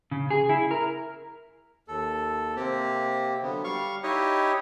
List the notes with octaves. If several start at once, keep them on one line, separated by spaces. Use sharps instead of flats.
C#3
G#4
E4
A#4
D#2 A4
C3 A#3 C4 G4
D3 F#3 B3
G3 F5 C#6
D#4 E4 G4 C#5 D#5